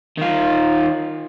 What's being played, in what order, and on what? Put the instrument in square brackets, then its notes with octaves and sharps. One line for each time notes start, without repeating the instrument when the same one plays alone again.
[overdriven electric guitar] D#3 F4